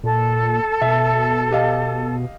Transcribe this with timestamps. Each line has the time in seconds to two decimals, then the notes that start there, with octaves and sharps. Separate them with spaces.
0.04 A#2 A4
0.81 B2 E5
1.51 G4 D#5 F5